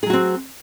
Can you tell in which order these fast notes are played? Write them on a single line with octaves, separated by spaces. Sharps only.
G#4 F#3 F#4 C4